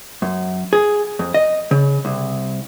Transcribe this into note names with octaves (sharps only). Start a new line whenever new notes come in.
F#2
G#4
F2
D#5
C#3
C2